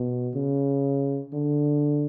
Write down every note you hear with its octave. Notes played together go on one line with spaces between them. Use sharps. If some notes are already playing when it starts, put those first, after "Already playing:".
Already playing: B2
C#3
D3